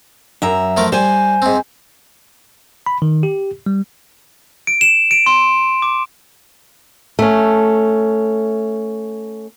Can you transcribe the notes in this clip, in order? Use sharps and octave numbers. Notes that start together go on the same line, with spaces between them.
F#2 E5 A#5
F3 A3 A#4
G3 C5 G#5
G#2 C4
B5
D#3
G4
G3
D7
E7
D7
C6
D6
A3 C#4